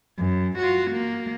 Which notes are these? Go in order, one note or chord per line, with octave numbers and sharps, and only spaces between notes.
F#2
F4 F#4
A#3